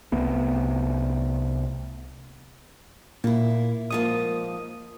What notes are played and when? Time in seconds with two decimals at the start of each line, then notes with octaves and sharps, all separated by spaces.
0.12 C2 A3 B3
3.24 A#2 A#3 E4
3.90 G#2 F3 A#3 D#6